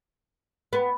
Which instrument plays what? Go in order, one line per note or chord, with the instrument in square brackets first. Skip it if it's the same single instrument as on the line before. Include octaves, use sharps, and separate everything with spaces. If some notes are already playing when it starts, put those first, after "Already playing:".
[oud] B3